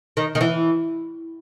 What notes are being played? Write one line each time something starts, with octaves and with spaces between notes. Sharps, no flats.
D#3
D#3
E3